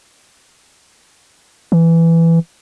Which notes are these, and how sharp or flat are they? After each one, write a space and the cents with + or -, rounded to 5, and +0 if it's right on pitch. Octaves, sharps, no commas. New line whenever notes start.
E3 +10